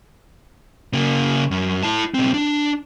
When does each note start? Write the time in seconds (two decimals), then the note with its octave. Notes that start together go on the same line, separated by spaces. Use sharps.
0.93 C#3 A#3
1.51 F#2
1.83 E4 A5
2.14 B1 C4
2.34 D4